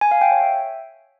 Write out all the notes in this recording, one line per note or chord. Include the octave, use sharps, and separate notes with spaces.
G#5
F5
G5
C#5
E5